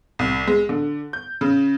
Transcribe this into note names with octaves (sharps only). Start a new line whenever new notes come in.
C2
G#3
D3
G6
C#3